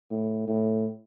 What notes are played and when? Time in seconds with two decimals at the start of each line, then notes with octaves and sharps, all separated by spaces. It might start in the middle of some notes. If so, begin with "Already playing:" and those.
0.11 A2
0.48 A2